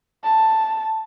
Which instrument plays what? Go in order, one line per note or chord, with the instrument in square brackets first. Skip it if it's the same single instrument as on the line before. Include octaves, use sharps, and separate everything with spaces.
[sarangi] A5